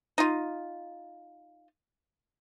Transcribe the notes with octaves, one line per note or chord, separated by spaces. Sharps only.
D#4 F4